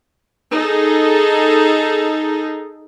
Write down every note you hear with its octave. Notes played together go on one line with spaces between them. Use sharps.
D#4 G#4 A4